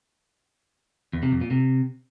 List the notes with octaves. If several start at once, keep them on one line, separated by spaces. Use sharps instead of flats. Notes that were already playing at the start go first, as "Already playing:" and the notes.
E2
C3
F2
A#2
C3